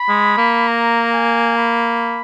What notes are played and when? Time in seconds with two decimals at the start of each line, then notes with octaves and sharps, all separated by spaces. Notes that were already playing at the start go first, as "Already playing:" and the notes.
Already playing: B5
0.08 G#3
0.38 A#3
0.68 A#5
1.12 G#5
1.57 B5